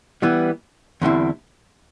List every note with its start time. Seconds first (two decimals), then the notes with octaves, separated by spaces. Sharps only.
0.22 E3 G3 B3
1.02 E2 D3 G3 C4 E4